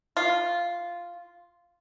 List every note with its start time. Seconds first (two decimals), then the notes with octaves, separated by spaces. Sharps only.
0.17 F4